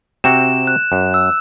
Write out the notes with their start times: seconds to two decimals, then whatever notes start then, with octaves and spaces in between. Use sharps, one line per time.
0.24 C3 C4 F#4 E7
0.67 F#6
0.92 F#2
1.14 E6